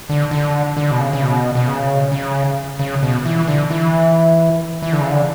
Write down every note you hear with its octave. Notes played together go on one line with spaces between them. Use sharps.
D3
D3
D3
B2
C#3
C#3
B2
B2
C#3
C#3
C#3
B2
E3
D3
E3
E3
D3
C#3
D3